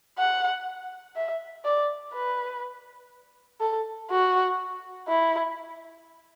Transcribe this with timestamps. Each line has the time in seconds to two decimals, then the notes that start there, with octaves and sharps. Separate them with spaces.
0.18 F#5
1.16 E5
1.65 D5
2.14 B4
3.61 A4
4.11 F#4
5.08 E4